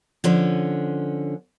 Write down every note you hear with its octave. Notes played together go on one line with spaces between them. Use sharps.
D3 F3 C#4